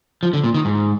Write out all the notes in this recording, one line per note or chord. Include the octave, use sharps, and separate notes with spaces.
F3
D3
A#2
D#3
G#2